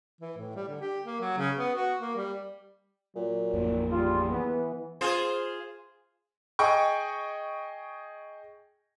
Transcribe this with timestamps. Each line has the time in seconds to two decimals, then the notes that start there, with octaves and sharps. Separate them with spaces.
0.21 E3
0.37 A2
0.56 G3
0.68 D3
0.81 G4
1.04 A#3
1.20 F#3
1.37 C#3
1.57 B3
1.75 F#4
2.00 A#3
2.15 G3
3.16 A#2 F#3
3.54 A1 F2 A#3
3.91 G3 F4 G#4
4.30 E3 B3
5.01 F4 G#4 C5
6.59 G#4 D#5 G5 C#6